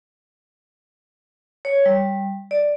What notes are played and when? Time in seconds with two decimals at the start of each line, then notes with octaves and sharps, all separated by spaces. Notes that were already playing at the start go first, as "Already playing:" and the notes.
1.65 C#5
1.86 G3
2.51 D5